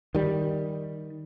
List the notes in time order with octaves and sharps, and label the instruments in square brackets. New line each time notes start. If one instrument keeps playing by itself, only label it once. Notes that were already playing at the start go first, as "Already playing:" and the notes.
[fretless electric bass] D#3 G3